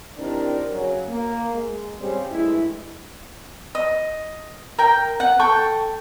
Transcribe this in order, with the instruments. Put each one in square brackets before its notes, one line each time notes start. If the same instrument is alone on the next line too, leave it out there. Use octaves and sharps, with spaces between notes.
[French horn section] D#3 C4 D4 E4 G4 A#4
C#3 F#3
A#3
G#3
C#3 G3 C4
G2 E3 G#3 A3 E4
[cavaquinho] D#5
A#4 G5
F#5
A4 G5 C#6